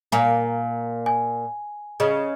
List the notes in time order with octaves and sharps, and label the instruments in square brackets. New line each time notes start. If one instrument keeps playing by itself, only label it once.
[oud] A#2 A#3 [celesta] G#5
[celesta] G#5
[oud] C#3 [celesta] D#5